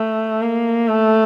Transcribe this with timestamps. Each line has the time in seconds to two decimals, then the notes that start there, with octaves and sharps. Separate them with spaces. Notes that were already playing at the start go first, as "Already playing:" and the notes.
Already playing: A3
0.42 A#3
0.88 A3